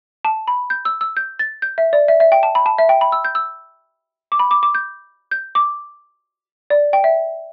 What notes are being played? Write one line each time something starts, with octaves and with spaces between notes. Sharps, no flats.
A5
B5
G6
E6
E6
G6
A6
G6
E5
D5
E5
E5
G5
A5
B5
A5
E5
G5
B5
E6
G6
E6
D6
B5
D6
D6
G6
G6
D6
D5
G5
E5